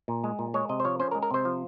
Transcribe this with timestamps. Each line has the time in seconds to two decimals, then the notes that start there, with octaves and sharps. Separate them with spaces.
0.08 A#2
0.24 G#3
0.39 A#2
0.54 G#3 C#5
0.69 C3 D#5
0.80 C5
0.85 F3 C#5
1.00 C#4 C5
1.11 A#4
1.15 G#3
1.22 A#4
1.31 C3 C5
1.45 F3